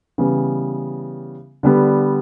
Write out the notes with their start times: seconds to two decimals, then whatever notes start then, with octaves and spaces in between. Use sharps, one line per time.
0.18 C#3 E3 G3 B3
1.63 D3 G3 B3